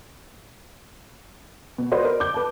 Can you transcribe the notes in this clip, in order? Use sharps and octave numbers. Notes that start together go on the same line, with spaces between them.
B2
F#4 B4 C5 D5 D#5
A#4
D6 G6
B4 A5